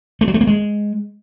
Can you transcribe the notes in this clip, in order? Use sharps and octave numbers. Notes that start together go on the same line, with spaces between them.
A3
F#3
A3
A#3
G#3